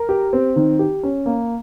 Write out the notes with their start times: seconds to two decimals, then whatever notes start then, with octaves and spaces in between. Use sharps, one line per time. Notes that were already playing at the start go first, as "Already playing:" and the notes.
Already playing: A#4
0.09 G4
0.33 C4
0.56 D#3
0.79 G4
1.03 C#4
1.26 A#3